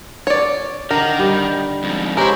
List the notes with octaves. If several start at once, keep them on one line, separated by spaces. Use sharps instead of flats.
C#5 D5
D3 D#3 A#4
G3
F2 G#2
G#3 C#4 E4 G4 A#4 C5